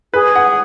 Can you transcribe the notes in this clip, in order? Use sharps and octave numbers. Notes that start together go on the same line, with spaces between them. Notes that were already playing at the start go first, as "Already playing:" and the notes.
G#4 B4
F#5